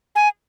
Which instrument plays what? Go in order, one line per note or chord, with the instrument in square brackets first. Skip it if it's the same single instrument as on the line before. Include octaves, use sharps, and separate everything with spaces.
[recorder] G#5